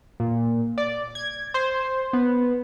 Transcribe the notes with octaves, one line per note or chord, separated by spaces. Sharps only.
A#2
D5
G#6
C5
B3